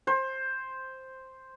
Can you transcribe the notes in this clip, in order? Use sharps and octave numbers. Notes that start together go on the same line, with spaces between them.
C5